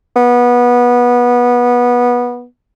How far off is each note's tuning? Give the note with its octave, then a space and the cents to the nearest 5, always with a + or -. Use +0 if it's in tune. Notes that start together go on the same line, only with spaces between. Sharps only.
B3 -20